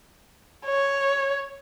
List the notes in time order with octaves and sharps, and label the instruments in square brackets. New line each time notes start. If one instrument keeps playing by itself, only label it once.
[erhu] C#5